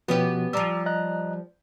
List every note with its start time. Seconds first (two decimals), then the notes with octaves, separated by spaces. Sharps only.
0.08 B2 F3 B3 C#4 F#4 G4
0.53 F3 G3 A#5 D6 E6
0.86 D#5 A#5 F#6